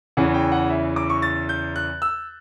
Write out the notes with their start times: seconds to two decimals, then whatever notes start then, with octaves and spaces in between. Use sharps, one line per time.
0.17 E2 C#3 E3 F#5
0.34 G5
0.52 F#5
0.70 E5
0.96 D6
1.10 C#6
1.22 A6
1.49 G6
1.76 F#6
2.02 E6